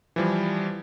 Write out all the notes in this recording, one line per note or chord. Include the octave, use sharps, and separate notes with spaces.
E3 F3 G3